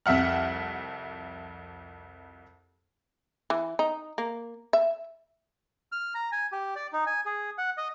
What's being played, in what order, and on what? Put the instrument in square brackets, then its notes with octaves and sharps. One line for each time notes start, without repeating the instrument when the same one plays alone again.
[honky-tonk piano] C2 F2 E5 F#5 F6
[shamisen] E3
D#4
A#3
E5
[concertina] F6
A#5
G#5
G4
D5
D#4
G#5
G#4
F#5
D#5